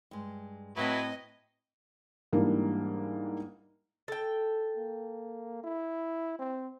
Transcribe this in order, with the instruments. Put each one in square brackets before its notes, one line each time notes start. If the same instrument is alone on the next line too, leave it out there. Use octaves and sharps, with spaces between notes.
[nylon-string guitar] G2 G#3
[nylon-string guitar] A2 C4 A5 [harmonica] F#3 E4 B4 [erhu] D#5
[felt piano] G#2 E3 G3 A#3 D4
[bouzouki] A4 G5
[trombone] A#3
E4
C4